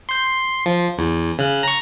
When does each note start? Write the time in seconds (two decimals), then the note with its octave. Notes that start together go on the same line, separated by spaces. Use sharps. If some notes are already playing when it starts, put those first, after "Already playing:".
0.09 C6 G6
0.24 C6
0.66 F3
0.98 E2
1.39 C#3 F#6
1.63 A#5 C#6